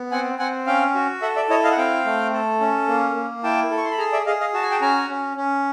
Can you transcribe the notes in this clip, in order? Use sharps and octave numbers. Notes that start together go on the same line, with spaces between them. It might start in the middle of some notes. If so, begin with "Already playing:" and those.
Already playing: B3
C4 F#5 G#5
C4 F#5 G#5
C#4 F5 G5
F#4
A4 E5 F#5
D5 E5
E4 C#5 D#5
D#5 F5
F#5
C4 F5 G5
A3
A4
C#4
A#3
A#3
E4 G5 A5
A4
C#6
C6
B5
G#4 G#5 A#5
D5 E5
G#4 D#5 F5
D#5 F5
F#4 A5
G#5
G5 A5
C#4 G#5 A#5
C#4
C#4